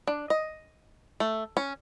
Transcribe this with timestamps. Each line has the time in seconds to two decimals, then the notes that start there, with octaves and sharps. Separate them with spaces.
0.07 D4
0.30 D#5
1.20 A3
1.57 C#4